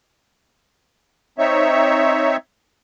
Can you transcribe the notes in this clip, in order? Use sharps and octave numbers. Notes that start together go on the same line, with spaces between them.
C4 D#4 C#5 E5